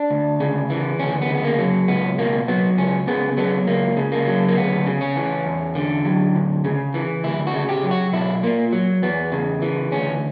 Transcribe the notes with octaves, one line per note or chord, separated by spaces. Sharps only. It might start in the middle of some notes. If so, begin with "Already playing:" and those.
Already playing: D4
D2
C#3
E3
D2 C#4
B3
C#3
B3
A#3
F#3
C#2 B3
B2 A#3
F#3 B3
C#2 C#4
C#3 B3
F#3 B3
C#2 A#3
C#3
A#3
F#3
A#3
D2 B3
C#3
C#4
E3
E2
D3
F#3
D2
C#3
E3
D2 E4
F#4
C#3
G4
F#3
F#4
B1 E4
A#2 A#3
F#3
E2 B3
C#3
E3
D2 C#4